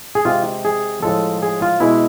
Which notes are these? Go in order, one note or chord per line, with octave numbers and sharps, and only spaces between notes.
G#4
C3 G#3 F4
G#4
A2 F3 G#3 A4
G#4
F4
B2 G#3 E4